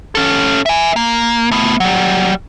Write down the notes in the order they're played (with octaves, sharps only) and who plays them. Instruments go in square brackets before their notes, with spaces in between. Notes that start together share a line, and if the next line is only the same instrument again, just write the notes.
[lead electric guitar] C#4 A4
E5 G#5
A#3
A3 B3
F#3 G3